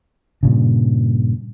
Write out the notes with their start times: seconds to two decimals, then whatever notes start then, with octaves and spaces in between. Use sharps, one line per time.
0.43 G2 A#2 C#3